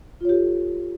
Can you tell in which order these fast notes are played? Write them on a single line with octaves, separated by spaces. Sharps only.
F4 C#5 G4 A4